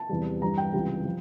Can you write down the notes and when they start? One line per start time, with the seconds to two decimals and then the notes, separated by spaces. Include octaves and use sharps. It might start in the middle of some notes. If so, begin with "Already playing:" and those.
Already playing: A5
0.09 E2 C3 E3 G3
0.42 G2 E3 G3 A#5
0.58 G5
0.73 C#2 C3 E3 G3
1.05 F3